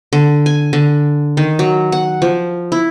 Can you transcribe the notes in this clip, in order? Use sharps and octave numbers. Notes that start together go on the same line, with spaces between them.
D3
G#5
D3
D#3
F#3
F#5
F3
E4